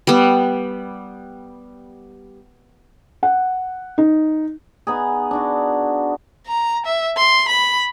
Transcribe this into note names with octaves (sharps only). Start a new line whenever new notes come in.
G3 B3
F#5
D#4
B3 D#4 G#4
D4 D#4 F#4
A#5
E5
C6
B5